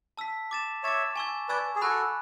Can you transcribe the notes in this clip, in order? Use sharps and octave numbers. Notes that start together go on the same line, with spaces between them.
A5 E6 B6
D6 A6 E7
C#5 E5 D6 A6 E7
G#5 C#6 E6 G#6
B4 D5 G#5 C#6 E6 G#6
G#4
F#4 A4 G#5 B5 F#6